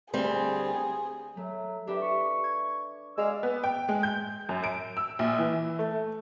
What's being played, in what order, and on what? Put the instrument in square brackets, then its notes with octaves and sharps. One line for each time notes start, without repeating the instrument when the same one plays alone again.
[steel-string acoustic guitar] D2 G3 C4 [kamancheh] G#4
[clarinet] F#3 [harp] A3
[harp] D4 B4 E5 [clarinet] G4
[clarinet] C#6
[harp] G#6
[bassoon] G#3 [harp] G#4 D5 F5 [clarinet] E6
[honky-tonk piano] B3
G5
G#3
G6
F#2
D7
E6
A#1
E3
A3